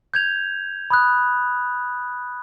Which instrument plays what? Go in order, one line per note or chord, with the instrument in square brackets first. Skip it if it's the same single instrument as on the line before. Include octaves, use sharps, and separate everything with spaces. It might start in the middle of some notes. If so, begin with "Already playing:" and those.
[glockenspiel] G6 G#6 F7
B5 D#6 F#6